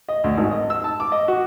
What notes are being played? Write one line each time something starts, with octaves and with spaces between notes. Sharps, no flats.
D#5
D2
G#1
D#5
E6
A5
D6
D#5
F#4